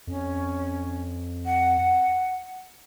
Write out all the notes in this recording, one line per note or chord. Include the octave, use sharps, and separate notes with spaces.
F2 C#4
F#5